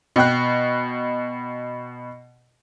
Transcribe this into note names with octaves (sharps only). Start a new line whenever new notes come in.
B2 G5 F#6